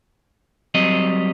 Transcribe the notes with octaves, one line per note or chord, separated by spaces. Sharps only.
F#3 G3 C4 D#5